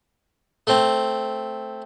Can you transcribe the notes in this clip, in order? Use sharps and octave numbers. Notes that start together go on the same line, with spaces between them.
A3 C4